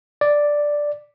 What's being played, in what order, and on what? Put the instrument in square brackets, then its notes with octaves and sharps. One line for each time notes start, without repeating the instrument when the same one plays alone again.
[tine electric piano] D5